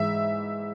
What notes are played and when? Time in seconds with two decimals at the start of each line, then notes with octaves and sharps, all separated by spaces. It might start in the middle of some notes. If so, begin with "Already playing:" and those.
Already playing: G#2 E3 G#3 E5